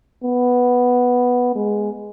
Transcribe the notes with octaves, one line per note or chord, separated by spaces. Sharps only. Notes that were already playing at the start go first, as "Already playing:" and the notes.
B3
G#3